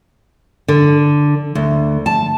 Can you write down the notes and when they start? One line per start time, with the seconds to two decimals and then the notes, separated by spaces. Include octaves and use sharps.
0.68 D3
1.55 D2
2.06 A5